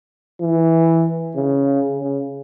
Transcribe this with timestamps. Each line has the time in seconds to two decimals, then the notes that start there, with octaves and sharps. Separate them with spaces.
0.41 E3
1.36 C#3
1.99 C#3